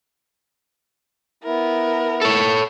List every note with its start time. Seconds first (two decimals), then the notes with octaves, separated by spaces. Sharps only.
1.44 B3 E4 A#4
2.21 A4 C#5